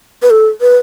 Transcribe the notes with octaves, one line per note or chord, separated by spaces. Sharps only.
B4
A4
B4